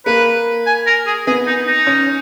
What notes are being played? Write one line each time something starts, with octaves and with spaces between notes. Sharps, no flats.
A#3 B4
G#5
A#4
G#4
B3 G#4
D#4
D#4
C#4